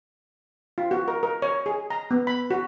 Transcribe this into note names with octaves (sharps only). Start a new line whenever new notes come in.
F4
F#4
A#4
A#4
C#5
G#4
A#5
B3
B5
F#4